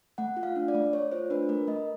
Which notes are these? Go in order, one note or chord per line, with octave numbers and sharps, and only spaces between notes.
A3 F#5
F4
F5
D4
D5
A3
A3 C#5
F4 C5
D4 B4
A3 A#4
A3 D#5